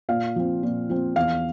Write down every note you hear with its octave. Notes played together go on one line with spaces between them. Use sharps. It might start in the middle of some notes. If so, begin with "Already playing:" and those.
A#2 F5
F3 C4
A#2
F3 C4
E2 F5